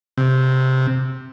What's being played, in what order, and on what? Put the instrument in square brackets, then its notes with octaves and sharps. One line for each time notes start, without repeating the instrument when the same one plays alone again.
[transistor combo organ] C3